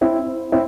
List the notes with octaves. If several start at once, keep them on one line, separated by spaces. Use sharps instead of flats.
C4 E4
C4 E4